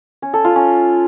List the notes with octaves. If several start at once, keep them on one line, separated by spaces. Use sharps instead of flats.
C#4
A4
F4
C#4